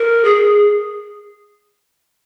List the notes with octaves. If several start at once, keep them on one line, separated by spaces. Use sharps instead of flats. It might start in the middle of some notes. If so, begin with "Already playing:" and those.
Already playing: A#4
G#4